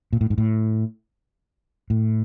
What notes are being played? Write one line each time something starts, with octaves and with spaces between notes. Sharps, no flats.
A#2
A2
G#2
A2
A2